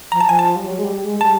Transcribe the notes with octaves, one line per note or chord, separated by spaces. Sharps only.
F3 A#5
A5
F3 G#5
A5
G3
F#3
G#3
G3
G#3
G3 A5